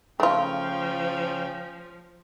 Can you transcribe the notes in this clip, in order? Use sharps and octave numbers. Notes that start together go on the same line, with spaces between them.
C#3 F3 A3 C#4 F4 G5